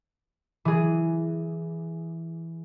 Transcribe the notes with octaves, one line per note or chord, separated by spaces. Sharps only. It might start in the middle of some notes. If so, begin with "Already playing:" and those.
E3 G#4